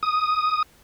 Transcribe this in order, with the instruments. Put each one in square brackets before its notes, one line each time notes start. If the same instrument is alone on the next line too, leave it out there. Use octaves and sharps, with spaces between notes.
[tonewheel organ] D#6